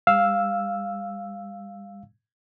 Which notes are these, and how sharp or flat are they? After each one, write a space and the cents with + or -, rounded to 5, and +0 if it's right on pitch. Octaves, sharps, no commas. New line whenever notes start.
G3 +40 F5 +0 E6 +0